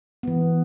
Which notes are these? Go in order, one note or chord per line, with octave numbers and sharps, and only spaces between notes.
E3 B3